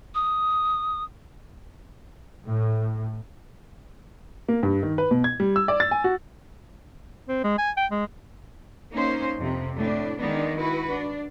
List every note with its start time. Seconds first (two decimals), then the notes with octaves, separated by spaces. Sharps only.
0.15 D#6
2.47 A2
4.49 A#3
4.63 G2
4.83 D#3
4.98 B4
5.11 B2
5.24 G#6
5.40 G3
5.56 E6
5.68 D5
5.80 A6
5.91 G#5
6.04 F#4
7.29 C4
7.44 G#3
7.58 G#5
7.77 G5
7.91 G#3
8.93 A#3 C#4 D#4 C5
9.39 F2 C3
9.77 A2 D4
10.18 D#3 G#3 B3 D4 D#4
10.57 E4 F#4 B4
10.91 D4